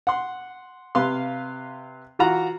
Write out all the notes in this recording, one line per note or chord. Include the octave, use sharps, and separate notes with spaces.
F#5 C6
C3 B4 F5 C6
E3 F4 F#4 F#5 A#5